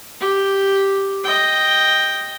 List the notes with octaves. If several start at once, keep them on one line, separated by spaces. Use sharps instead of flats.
G4
D#5 G5